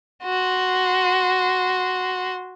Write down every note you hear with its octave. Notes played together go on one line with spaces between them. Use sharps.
F#4 C6